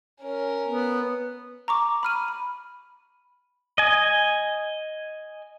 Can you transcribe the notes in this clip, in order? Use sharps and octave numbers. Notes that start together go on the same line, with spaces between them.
C#4 A#4
B3
A#5 C#6 D6
B5 F6 D#7
B5
D#5 G#5